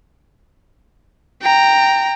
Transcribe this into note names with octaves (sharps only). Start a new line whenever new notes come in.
G5 A#5